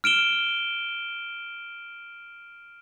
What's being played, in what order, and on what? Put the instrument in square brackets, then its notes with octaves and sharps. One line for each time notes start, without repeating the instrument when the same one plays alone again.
[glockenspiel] F6 D7 E7 G7